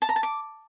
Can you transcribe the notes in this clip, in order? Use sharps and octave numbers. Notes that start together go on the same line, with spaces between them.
A5
A#5
A5
D6